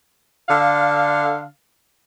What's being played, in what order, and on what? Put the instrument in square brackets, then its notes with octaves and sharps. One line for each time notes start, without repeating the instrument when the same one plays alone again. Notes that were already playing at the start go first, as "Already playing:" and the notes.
[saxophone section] D3 F5